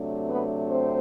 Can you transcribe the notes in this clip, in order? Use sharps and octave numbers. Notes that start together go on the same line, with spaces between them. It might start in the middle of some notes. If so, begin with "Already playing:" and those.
Already playing: C3 F#3 A3 D4
B3 B4
C4 C5